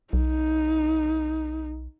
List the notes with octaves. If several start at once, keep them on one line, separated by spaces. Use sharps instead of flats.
B1 D#4